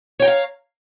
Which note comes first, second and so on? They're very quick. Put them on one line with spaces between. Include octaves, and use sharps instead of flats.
C#5 G5 A#5 F5